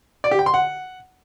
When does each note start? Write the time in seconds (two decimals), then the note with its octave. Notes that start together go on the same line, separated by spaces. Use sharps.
0.24 D5
0.31 G4
0.39 G5
0.46 C6
0.54 F#5